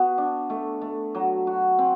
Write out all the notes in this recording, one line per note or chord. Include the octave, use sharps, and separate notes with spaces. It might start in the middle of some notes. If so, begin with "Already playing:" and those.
Already playing: B3 F#4
D4
A3
A3
F#3
F#4
C4